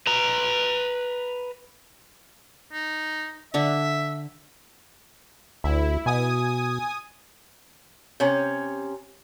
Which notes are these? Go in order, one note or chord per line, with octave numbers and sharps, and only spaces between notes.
B4 A#5
D#4
D3 D4 E5 C#6
D2 E4
B2 G#5 D#6
C3 C#4